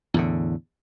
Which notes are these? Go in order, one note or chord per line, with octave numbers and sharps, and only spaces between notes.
E2 A2 D3